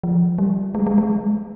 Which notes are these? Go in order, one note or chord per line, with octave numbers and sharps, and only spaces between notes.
F3
G3
G#3
G#3
G#3